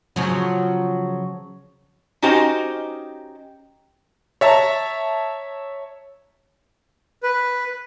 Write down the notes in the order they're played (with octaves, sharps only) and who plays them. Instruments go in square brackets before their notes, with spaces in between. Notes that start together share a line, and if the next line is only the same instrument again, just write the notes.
[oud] C#3 F3 F#3
[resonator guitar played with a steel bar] C#4 D#4 F#4 G4 C5 D#5
[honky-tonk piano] C#5 E5 A5 A#5
[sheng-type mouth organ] B4